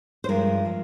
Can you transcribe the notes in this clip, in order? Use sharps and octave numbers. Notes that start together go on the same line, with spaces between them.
C5
G2 F3 G#3 A#4
F3 G#3